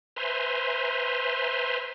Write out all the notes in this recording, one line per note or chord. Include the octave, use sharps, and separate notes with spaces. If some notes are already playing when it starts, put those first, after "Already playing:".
B4 C5 E5 G#5 A#5 C6